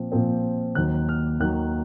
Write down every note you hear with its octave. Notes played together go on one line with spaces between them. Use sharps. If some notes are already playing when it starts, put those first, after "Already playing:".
Already playing: A#2 F3 C4
A#2 F3 C4
D#2 D#3 F#3 F#6
F6
D#2 D#3 F#3 F#6